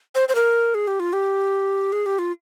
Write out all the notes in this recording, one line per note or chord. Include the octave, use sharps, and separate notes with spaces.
C5
C5
A#4
G#4
G4
F4
G4
G#4
G4
F4